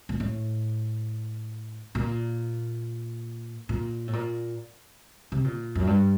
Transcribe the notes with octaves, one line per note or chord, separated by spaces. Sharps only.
A#2
A2
A#2
A#2
A2
A#2
C3
A#2
F#2
G2